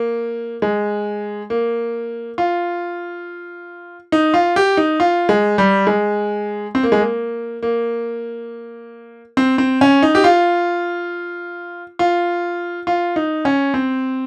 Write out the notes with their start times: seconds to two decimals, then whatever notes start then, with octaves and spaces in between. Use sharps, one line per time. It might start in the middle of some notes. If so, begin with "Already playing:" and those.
Already playing: A#3
0.62 G#3
1.50 A#3
2.38 F4
4.12 D#4
4.34 F4
4.56 G4
4.77 D#4
5.00 F4
5.29 G#3
5.58 G3
5.87 G#3
6.75 C4
6.83 A#3
6.92 G#3
7.00 A#3
7.63 A#3
9.37 C4
9.58 C4
9.81 C#4
10.03 D#4
10.15 G4
10.24 F4
11.99 F4
12.87 F4
13.16 D#4
13.45 C#4
13.74 C4